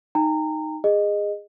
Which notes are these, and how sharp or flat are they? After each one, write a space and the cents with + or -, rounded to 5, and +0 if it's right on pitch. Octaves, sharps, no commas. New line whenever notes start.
D#4 +0 G5 +30 A#5 -25
G#4 -20 D#5 -15